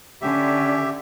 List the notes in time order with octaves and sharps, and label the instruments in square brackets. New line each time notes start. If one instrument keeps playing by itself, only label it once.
[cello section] D3 [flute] C#4 [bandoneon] G4 E5